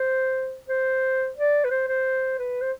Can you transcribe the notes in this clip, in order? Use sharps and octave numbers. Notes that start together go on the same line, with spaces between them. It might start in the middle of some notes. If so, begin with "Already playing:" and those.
Already playing: C5
C5
D5
B4
C5
C5
B4
C5